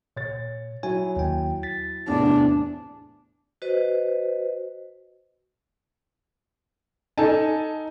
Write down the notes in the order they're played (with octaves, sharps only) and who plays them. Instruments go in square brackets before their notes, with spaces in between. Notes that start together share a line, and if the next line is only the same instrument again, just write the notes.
[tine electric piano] A#2 [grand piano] C#5 A6
[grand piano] F#3 E4 [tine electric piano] C#5 G#5
[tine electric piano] D#2 G5
A6 B6
[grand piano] E2 A2 C3 [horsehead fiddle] D4
[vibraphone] F#4 B4 C5 D#5
[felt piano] D#4 [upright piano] A4 G#5 A5